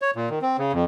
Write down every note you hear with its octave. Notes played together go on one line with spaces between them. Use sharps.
C#5
A#2
D#3
C4
C#3
F2